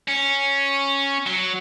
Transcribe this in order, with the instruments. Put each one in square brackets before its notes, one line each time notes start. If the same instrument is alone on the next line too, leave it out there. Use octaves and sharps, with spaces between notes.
[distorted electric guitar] C#4
F#3